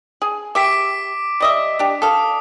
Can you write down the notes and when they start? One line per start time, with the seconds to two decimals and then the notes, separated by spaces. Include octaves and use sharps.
0.22 G#4
0.55 G4 C#5 E5 D6 B6 D7
1.40 G3 D#5 E5
1.79 D4 G4
2.02 A4 F5 D#6